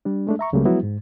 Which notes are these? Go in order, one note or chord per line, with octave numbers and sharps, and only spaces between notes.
G3 D4
G#3 A3 D4
E5 A#5 C#6
C#2 C#3 F#3 G3 A3 A#3
F3 F#3 G#3 B3 E4 F#4
G#2